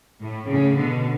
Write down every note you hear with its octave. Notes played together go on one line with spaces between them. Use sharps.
A2
A2 C#3
B2 D3